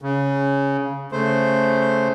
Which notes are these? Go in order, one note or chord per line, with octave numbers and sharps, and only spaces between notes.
C#3
C#3 A3 C5